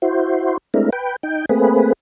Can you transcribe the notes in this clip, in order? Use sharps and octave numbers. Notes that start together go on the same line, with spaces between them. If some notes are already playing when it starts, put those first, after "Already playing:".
E4 F#4 C5
G#3 A3 C4 D4 E4 A#4
B4 G5
D#4 G5
A3 A#3 C4 G#4 B4